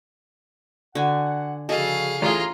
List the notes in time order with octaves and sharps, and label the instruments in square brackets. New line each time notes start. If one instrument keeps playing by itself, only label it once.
[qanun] D3 G#5 [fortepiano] F#4 [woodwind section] F#5
[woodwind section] C#3 F3 F#4 [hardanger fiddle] G#4 F5 [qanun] A4 [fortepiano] D#5
[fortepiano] A1 G#4 [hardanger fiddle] F4 [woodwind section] A#5